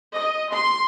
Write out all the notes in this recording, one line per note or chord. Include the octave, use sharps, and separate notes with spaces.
D#5
C6